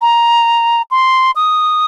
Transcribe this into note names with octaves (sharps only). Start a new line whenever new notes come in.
A#5
C6
D#6